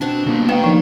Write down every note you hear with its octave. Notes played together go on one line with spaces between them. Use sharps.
B2 C4 D4 F#5
G1 C#3 A#3
A3 A#3 B4 D#5 G5
D#2 F3